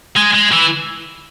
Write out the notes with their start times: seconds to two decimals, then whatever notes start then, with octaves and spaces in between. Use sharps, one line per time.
0.16 G#3
0.34 G#3
0.52 E3